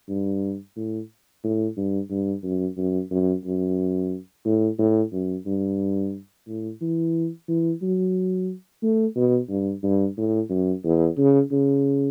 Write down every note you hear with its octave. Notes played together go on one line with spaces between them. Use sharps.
G2
A2
A2
G2
G2
F#2
F#2
F#2
F#2
A2
A2
F#2
G2
A2
E3
E3
F#3
A3
B2
G2
G2
A2
F#2
E2
C#3
C#3